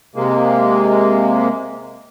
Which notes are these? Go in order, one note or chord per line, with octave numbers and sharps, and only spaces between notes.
C3 G#3 A#3